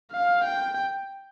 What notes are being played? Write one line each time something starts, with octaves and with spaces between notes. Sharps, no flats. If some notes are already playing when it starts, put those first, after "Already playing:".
F5
G5